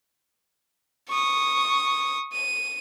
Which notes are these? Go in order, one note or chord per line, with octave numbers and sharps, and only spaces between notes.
C#6 D#6
D#7